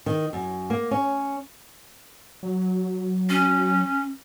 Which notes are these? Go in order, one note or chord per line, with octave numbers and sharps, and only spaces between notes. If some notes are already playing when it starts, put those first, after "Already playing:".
D#3
F#2
A#3
C#4
F#3
C#4